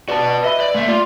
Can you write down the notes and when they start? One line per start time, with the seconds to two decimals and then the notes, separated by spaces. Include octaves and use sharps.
0.09 F#4 B4 D5 A5
0.44 B4 D#5 E5 B5
0.60 D5
0.74 A3 A#3 E5
0.88 F4 D5